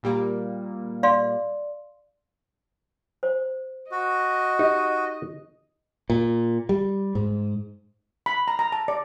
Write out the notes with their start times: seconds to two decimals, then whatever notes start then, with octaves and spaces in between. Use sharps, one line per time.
0.03 A#2 G3 A#3
1.03 D5 F5 C6
3.23 C5
3.91 F#4 D#5
4.59 D#4 G4
6.10 A#2
6.69 G3
7.15 G#2
8.26 B5
8.48 A#5
8.59 A#5
8.72 A5
8.88 D5